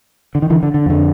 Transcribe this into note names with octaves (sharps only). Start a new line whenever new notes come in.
D3
D#3
D3 E3
D3
D3
F2 D3